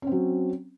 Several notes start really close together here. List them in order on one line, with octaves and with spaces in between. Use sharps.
C#4 C4 F#3